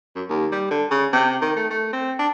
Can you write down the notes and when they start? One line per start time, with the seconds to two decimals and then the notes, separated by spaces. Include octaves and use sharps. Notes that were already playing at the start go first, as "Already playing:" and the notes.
0.15 F#2
0.30 D#2
0.52 G3
0.71 D3
0.91 C#3
1.13 C3
1.42 D#3
1.56 A3
1.71 A3
1.93 C4
2.19 D4